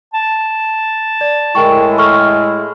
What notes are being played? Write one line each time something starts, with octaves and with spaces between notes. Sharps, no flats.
A5
D5
A2 G#3 E4 A#4 G5 C#6
A4 C#6 F6